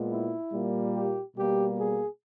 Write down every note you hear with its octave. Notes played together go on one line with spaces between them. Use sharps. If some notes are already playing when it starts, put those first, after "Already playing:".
Already playing: A#2 G#3 B3
E4
A#2 G3 A#3
G4
B2 G3 A#3 G4
G#4